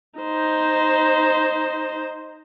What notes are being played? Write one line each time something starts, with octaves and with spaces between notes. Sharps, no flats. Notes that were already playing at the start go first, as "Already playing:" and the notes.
D#4 C5